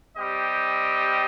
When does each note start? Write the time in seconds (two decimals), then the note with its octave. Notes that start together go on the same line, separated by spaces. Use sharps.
0.16 G3 C4 G4 D#5